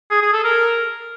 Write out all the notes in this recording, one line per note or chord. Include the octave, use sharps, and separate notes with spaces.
G#4
G#4
A4
A#4